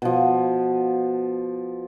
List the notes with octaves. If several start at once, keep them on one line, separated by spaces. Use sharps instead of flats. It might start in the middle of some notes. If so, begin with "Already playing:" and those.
B2 F3